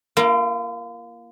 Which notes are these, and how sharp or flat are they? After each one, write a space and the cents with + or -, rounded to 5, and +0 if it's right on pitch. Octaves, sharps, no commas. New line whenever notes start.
A#3 +10 F4 -45